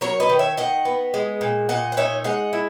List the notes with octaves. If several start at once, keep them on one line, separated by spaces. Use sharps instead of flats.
F#3 A#4 C#5
B4 D#5
D#3
C#5 E5
D#3 D#5 F#5
B3
G#3
A#2
A#2 D#5 F#5
F#5
D#4 C#5 E5
G#3 D#5 F#5
E4